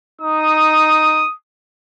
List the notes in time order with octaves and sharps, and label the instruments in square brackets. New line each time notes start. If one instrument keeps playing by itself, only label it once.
[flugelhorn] D#4 [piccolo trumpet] D#6